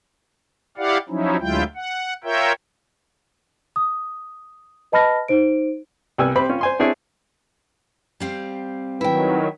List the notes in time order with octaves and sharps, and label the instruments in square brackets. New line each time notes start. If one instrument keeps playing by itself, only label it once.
[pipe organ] E4 G4 D5 F5 F#5
F3 F#3 C#4 D#4 E4
D2 F#3 G#3 E4 F4 G5
F#5
F4 A#4 C#5 E5 G5
[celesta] D#6
B4 D#5 A5 B5 F6 A#6
D#4 C5 D7
[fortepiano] C2 G3 B3 G#5 E6
C3 C4 B5
C#4 F4
C5 G#5 C6
C4 D4 E4 G#4 C#5 D5
[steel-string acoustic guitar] G3 C4 F5
[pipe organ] D#3 F#3 [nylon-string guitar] E4 G5 [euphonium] B4